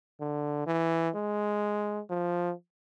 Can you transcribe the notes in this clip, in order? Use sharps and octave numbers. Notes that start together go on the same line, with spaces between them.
D3
E3
G#3
F3